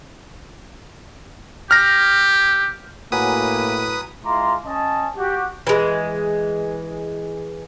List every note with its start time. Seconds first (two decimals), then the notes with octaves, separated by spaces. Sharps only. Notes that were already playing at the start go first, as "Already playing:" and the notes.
1.71 G4 F6 A#6
3.12 A2 F#3 A#3 B4 G#5 D#6
4.24 G#3 E4 F4 A#5 C6 D6
4.65 C#4 D#5 A5
5.17 F#4 G4
5.67 E3 G#3